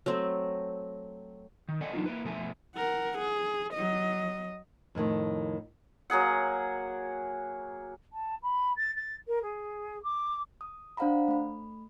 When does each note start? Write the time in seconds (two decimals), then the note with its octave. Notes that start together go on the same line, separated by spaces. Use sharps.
0.06 F#3 A3 C4
1.69 D#3
1.81 A4 D5 D#5 F#5 G#5
1.93 E3 F#3 D4 D#4 F4
2.06 A#3 E4 B4
2.25 B2 F3 A3 A4 E5 G#5
2.76 A#4 F#5
3.19 G#4
3.74 F#3 D#5
4.95 F2 A2 D3 D#3
6.10 F#3 A#3 G#4 F#5
8.13 A5
8.43 B5
8.77 A6
8.96 A6
9.28 A#4
9.42 G#4
10.03 D6
10.61 D#6
10.97 D4 C5 F5 F#5 A#5 B5
11.28 A3 B5